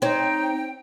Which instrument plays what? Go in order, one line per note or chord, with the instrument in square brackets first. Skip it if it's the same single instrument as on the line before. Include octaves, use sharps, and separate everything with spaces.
[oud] C4 C#5 [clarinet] D#4 [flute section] G5